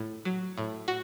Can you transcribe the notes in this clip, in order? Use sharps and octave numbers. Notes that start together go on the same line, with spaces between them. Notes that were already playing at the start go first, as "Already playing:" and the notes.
Already playing: A2
F#3
A2
F#4